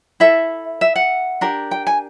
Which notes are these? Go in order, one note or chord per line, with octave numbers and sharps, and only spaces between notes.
E4 A4 E5
E5
F#5
D4 G4 A#4
G5
G#5